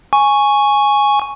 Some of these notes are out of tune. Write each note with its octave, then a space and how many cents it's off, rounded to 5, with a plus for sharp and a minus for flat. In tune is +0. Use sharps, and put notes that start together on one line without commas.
G#5 +0 C#6 +0